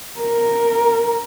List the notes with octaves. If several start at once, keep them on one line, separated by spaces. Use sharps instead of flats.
A#4